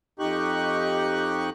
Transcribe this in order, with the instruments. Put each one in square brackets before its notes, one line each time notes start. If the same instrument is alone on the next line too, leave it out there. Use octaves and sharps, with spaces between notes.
[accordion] F2 D#4 G4 C#6 F#6